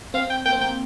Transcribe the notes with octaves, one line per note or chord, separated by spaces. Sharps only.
C4 F5
G5
A#3 G5
C4
A#3 G5